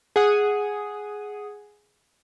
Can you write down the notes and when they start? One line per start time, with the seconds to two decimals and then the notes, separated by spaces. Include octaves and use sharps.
0.16 G#4 F#5 D#6